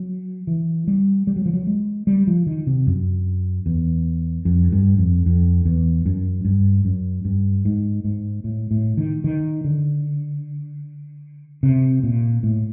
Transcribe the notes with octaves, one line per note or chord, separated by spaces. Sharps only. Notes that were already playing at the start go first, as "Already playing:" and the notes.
Already playing: F#3
E3
G3
G3
F#3
F3
F#3
G#3
G3
F3
D#3
C3
F#2
E2
F2
G2
F2
F2
E2
F#2
G2
F#2
G2
G#2
G#2
A2
A2
D#3
D#3
D3
C3
A#2
A2